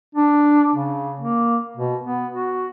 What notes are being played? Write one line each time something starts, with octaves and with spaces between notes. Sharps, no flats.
D4
C#3
A#3
B2
B3
F#4